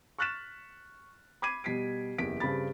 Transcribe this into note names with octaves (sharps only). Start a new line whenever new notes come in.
C#6 F6 F#6 A6 B6 E7
B5 D6 G#6 C7 D#7
B2 G3 B6 C7 D7
F#1 E2 G4 B6 D7
G2 C#3 C4 B5 A6